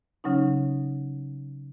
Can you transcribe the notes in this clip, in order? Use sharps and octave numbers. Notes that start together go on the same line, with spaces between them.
C#3 F#3 C#4 D#4